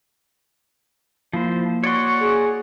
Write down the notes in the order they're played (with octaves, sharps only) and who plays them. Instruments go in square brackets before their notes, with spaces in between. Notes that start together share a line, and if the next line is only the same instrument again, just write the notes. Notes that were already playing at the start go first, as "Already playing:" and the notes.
[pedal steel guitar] F3 C5 [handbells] A#3 E4
[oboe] F#4 [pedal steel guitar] C#5 D5 C6
[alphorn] G#4